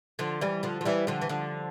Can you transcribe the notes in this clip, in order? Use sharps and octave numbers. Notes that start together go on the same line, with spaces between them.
D3 F3
E3 G3
D3 F3
F3
E3 G3
D3 F3
E3
D3 F3